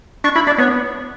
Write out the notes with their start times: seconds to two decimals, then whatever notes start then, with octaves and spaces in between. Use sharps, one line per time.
0.24 D4 C#6
0.35 E4 B5
0.47 D4 D5
0.58 B3 C#5